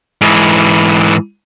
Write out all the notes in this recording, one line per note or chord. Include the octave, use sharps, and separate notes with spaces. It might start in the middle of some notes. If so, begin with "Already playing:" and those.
G#2 E3